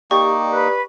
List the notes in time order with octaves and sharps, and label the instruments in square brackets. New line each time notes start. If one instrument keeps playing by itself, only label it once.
[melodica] A#3 D#4 [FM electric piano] G4 D5 [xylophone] C#6
[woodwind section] B4